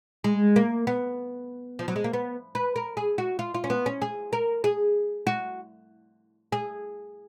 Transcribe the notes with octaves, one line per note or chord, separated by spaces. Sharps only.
G#3
A#3
B3
F3
F#3
G#3
A#3
B3
B4
A#4
G#4
F#4
F4
F4
C#4
B3
C#4
G#4
A#4
G#4
F#4
G#4